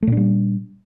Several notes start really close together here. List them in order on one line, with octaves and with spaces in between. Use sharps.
A3 A#2 D4 G3